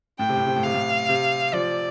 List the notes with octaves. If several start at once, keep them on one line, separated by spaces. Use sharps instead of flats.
A2 G5
C3
A2
C3
A2
C3 F5
A2
C3
F3 D5